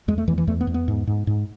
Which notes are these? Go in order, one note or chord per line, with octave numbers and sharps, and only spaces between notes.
E2 G#3
A3
E2 E3
E3
E2 A3
B3
E2
B3
G#2
G#2
G#2